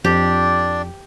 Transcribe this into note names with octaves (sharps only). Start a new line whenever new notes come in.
F2 D4 G4 D5